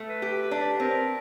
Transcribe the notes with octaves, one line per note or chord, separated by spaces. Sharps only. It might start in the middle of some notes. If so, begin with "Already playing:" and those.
Already playing: A3
B4
G4
D4
C4 A#4